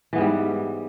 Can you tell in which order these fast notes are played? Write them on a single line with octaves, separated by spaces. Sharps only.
E3 B3 G#2 G3